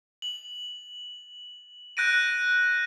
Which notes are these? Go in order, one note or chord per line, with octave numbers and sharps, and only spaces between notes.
F#7
F#6 G6 A#6 D7 D#7